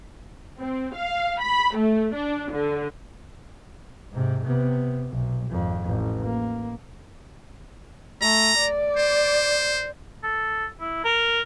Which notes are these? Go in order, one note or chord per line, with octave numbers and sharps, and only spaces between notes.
C4
F5
B5
A3
D4
D3
G#2 C3
C3 B3
B1
G#1 F2
A1
A#3
A3 A#5
D5
C5
A4
E4
A#4